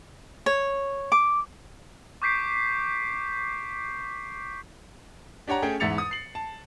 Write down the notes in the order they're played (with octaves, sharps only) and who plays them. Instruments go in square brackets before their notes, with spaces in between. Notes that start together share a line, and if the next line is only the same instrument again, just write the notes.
[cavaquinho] C#5
D6
[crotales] C#6 D6 G6 B6 C7 D7
[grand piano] D4 G4 C#5 F#5 A#5
A3 C#4 G#4 G5
E2 G#2 E5 A6 C#7 F7
D#6
C7 F#7
A5